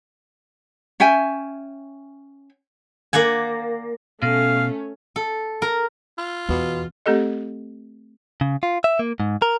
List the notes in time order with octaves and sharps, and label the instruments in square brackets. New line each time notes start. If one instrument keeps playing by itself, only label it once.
[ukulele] C#4 E5 G5 G#5
[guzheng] A#3 D5 F#5 G#5
[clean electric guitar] B2 [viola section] A3 C#4 [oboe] F5
[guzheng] A4
A#4
[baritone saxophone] F4
[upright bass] E2 [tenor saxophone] B2
[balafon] A3 C4 G4 A4 D#5
[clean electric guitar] C#3
F4
E5
A#3
G#2
A#4